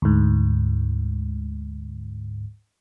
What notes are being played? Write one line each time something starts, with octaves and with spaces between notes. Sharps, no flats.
D2 G#2